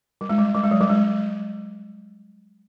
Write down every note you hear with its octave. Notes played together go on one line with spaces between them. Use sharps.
G3
G#3
G3
G3
G#3
F#3
G3
G#3